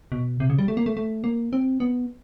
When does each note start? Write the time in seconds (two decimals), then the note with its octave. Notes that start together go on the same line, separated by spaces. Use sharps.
0.12 B2
0.40 C3
0.50 C#3
0.58 G3
0.68 A3
0.77 A#3
0.86 A3
0.97 A3
1.24 A#3
1.53 C4
1.80 B3